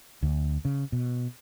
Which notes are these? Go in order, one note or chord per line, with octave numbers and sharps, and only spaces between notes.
D2
C#3
B2